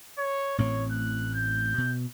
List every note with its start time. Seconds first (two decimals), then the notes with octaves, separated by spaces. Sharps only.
0.18 C#5
0.58 A1 A2 C4 C#5
0.91 F#6
1.34 G6
1.78 B2